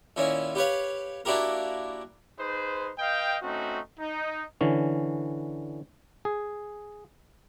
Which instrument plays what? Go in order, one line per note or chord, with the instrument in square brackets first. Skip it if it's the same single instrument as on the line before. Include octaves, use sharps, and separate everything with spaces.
[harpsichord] A#2 D#3 C#4 E4
G4 B4 C#5 F5
A#3 D4 E4 F#4 G4 A#4
[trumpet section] D#4 G#4 B4 C5
B4 D#5 F5 G5
A3 C4 C#4 D#4 F#4
D#4
[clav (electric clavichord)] D3 E3 C#4
G#4